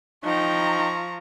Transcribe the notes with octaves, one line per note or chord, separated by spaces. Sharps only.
F3 D#4 G5 A#5 C#6